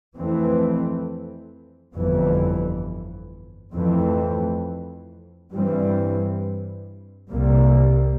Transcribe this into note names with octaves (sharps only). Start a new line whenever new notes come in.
F2 E3 A3 C4
G1 F2 E3
F2 E3 A3 C4
G2 E3 G3 C4
C2 C3 G3 A#3